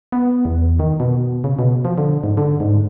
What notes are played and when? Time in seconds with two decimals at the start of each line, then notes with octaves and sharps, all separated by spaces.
0.12 B3
0.45 E2
0.79 D#3
1.00 B2
1.44 C#3
1.59 B2
1.85 F3
1.98 D3
2.24 G#2
2.37 D3
2.60 G#2